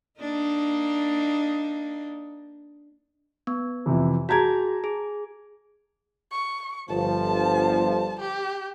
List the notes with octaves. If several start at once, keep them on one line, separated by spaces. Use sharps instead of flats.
A#3 D4 D#4
B3
F2 C3 E3
F#4 G#4 A5 A#5 G#6
G#4
C#6
G1 F3 A5
G4